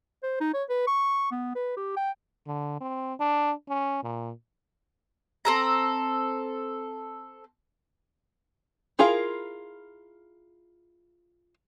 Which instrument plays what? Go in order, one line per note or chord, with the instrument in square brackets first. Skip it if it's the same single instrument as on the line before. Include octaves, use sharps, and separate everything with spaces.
[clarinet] C5
D#4
C#5
B4
C#6
B3
B4
G4
G5
[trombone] D3
C4
D4
C#4
A#2
[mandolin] C4 A4 A#5
[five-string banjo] E4 F4 G#4 A#4 F5